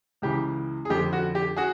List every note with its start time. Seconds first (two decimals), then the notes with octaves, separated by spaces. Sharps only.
0.22 C#2 C#3 E3 G4
0.85 G#4
0.90 F2 D3 F3 G4
1.13 F#4
1.35 G4
1.56 F#4 G#4